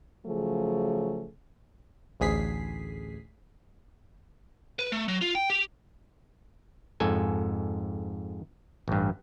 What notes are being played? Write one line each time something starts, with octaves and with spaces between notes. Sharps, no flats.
C#3 F3 F#3 A3 G#4
A1 D2 G#4 B6 C7
B4
A3
F#3
F4
G5
G4
F2 G#2 A4 G#5
A1 G2